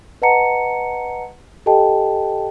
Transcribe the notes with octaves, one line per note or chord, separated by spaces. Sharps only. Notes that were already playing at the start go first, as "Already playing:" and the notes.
B4 D#5 F#5 A5 A#5 C#7
G4 A4 D#5 G5 A5